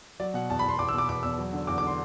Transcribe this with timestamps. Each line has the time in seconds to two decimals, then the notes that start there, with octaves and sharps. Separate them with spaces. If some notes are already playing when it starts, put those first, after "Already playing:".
0.20 F#3 D5
0.34 B2 F#5
0.50 E2 A5
0.59 B5
0.64 E2 C6
0.78 E2 D6
0.89 E6
0.94 B2 D6
1.08 E2 D6
1.23 E2 E6
1.38 F#3
1.53 D3
1.67 E2 D6
1.78 D6
1.82 D3 C6